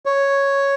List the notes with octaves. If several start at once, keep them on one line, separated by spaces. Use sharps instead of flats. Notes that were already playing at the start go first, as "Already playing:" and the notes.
C#5